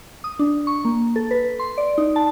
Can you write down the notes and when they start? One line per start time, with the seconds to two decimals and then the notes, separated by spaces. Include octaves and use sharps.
0.24 D#6
0.39 D4
0.67 C#6
0.85 A#3
1.16 A4
1.31 B4
1.60 C6
1.78 D5
1.98 D#4
2.16 A5